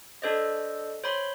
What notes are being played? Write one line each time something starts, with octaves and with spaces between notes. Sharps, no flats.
D4 A4 C5 D5 D#5
C5 C#5 B5 C6